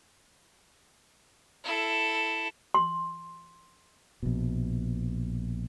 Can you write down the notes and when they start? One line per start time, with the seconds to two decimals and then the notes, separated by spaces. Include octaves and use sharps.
1.64 E4 A4
2.74 C6
4.23 A#1 B2